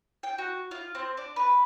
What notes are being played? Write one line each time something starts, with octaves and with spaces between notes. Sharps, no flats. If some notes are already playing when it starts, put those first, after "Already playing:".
G5
F#4
F4
C4
D4
B4